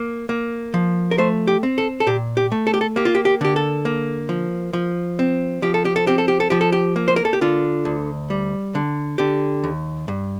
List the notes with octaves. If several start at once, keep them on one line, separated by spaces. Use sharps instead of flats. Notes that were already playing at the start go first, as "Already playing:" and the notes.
Already playing: A#3
A#3
F3
A#4
A3 C5
G4
C4
A4
A4
A#2 G4
G4
A3
A4
G4
A4
A#3 G4
F4
G4
G4
D3 G4
A4
A#3
F3
F3
C4
F3 G4
A4
G4
A4
C4 G4
A4
G4
A4
F3 G4
A4
G4
A#3
C5
A#4
A4
G4
D3 F4
D2
G3
D3
D3 G4
D#2
G2